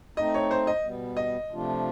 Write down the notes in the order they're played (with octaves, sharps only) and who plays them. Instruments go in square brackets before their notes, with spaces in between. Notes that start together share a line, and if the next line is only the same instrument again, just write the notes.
[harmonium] A3 C4 D#4 [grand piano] D#5
[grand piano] C#5
C5
D#5
[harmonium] B2 G3 B3
[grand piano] D#5
[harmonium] C3 F3 A3 D4 F4